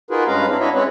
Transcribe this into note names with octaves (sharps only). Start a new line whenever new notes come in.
D#4 F4 F#4 G#4 A#4 B4
G2 G#3 C#4 B4 F5 A#5
C4 D4 E4
D4 E4 F#4 C#5 D#5 E5
G#3 C4 C#4 E4 B4 C#5